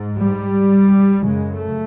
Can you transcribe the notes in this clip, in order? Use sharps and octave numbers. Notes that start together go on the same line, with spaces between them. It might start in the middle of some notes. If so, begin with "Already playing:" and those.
Already playing: G#2
G3
F#2 C#3 G#3
A3